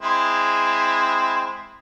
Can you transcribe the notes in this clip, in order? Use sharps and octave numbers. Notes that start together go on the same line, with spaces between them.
G#3 C4 E4